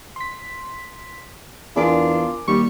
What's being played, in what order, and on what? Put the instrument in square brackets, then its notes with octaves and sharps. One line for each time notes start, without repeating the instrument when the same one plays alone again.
[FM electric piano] C6 B6
[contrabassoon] E2 [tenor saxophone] D4 [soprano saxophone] F4 [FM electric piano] G#4 A#4 D6
[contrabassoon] D#2 [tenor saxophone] G3 [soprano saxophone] C#6